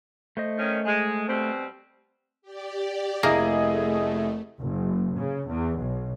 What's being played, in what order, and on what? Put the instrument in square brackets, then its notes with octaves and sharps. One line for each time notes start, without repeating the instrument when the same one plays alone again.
[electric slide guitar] A3 C5 D#5
[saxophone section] D#3 C#4
G#3
B2 G3 C4
[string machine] G4 D5
[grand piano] F1 E4 [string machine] A3 [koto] A#3 [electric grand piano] G#4 D#5
[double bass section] F#1
C#3
E2
B1